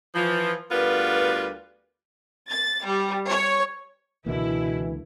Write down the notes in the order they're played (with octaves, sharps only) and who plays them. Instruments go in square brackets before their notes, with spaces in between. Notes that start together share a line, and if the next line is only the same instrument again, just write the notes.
[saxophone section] E3 F3
D2 G3 B3 F4 A#4 B4
[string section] A6
G3
C#5
[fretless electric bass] C#2 D3 A#3 [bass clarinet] B2 [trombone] E3 [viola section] E4